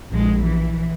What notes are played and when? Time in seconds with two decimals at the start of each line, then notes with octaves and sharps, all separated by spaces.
0.11 A#1 G#3
0.44 E3